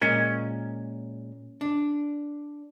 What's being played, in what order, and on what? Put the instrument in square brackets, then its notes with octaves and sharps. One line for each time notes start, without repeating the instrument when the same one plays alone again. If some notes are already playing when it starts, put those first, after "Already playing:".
[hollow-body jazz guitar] A#2 G#3 A#4 [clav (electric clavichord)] C#4
[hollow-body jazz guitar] D4